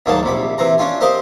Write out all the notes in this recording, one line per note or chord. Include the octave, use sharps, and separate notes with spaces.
D2 G#2 D#3 F#3 A#3 A5
A#1 C3 B5
C3 E3 C4 A#5
C#4 D4 F4 G#5
C4 G4 A#4 C5 D#5 F5